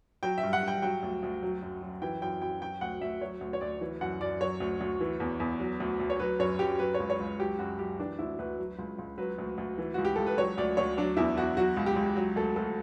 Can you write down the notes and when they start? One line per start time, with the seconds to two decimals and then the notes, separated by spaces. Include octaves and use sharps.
0.23 F#3 G5
0.38 E5
0.43 G2
0.53 F#5
0.63 G2 G5
0.82 F#3 G5
1.03 D2
1.23 D2
1.42 F#3
1.62 F#2
1.82 F#2
2.02 E3 G5
2.22 F#2 G5
2.42 F#2 G5
2.61 F#3 G5
2.81 D2 F#5
3.01 D2 E5
3.21 F#3 C#5
3.41 D2
3.53 C#5
3.61 D2 D5
3.81 E3
4.01 F#2 F#5
4.21 F#2 D5
4.41 F#3 C#5
4.60 D2
4.81 D2
5.01 E3
5.20 E2
5.40 E2
5.60 F#3
5.80 D2
6.00 D2
6.10 C#5
6.20 F#3 B4
6.39 F#2 C#5
6.59 F#2 G4
6.79 F#3 B4
6.94 C#5
7.00 C#2
7.10 C#5
7.20 C#2
7.39 F#3 G4
7.59 F#2 F#4
7.79 F#2 G4
7.99 E3 D4
8.19 D2 E4
8.39 D2 B4
8.59 F#3
8.79 C#2
8.98 C#2
9.18 F#3 B4
9.38 D2
9.58 D2
9.78 E3
9.94 C#2 F#4
10.05 G4
10.16 C#2 A4
10.27 B4
10.37 F#3 C#5
10.58 D2 D5
10.77 D2 C#5
10.97 F#3 D4
11.17 E2 E4
11.37 E2 F#4
11.57 F#3 F#4
11.77 C#2
11.86 G4
11.96 C#2
12.17 F#3
12.36 D2 A4
12.56 D2 A4